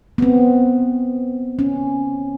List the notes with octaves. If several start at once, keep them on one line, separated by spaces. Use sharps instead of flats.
B3
C4
C#4